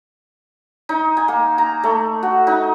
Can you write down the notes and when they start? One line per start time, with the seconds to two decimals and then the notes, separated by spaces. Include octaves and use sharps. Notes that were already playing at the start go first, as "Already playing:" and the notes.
0.89 D#4
1.17 G#5
1.28 A#3
1.58 A#5
1.83 A3
2.23 F#4
2.47 D#4